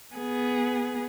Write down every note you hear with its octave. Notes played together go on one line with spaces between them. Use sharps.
B3 G#4